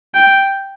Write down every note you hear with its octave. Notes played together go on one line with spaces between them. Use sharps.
G5